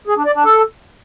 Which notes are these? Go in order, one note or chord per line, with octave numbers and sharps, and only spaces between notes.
G#4
D4
D5
D4
A4